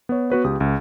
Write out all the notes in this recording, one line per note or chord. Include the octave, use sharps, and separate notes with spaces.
B3 C#5
B3 F#4 B4 C#5
C#2 G4 D#6
C#2